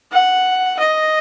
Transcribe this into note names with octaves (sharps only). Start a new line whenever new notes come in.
F#5
D#5